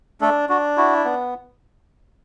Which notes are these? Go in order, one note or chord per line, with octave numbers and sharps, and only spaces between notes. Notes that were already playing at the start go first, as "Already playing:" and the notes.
A3 D4 A4
D4 F#4
E4 F#4
B3